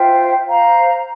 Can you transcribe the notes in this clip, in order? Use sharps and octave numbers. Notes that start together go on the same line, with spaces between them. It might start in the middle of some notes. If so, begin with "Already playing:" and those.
Already playing: F4 C5 E5 G5
C5 F5 A#5